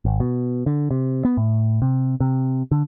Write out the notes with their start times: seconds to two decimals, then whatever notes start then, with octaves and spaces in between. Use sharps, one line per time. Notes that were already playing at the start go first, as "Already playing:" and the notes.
0.05 G#1
0.20 B2
0.66 D3
0.91 C3
1.25 B3
1.37 A2
1.82 C3
2.20 C3
2.71 D3